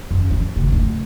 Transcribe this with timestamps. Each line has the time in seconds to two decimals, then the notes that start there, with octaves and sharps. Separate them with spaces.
0.11 F#2
0.31 E3
0.56 C#3 A3
0.72 A3